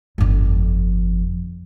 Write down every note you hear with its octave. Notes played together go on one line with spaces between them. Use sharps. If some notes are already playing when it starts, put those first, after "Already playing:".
G1 F2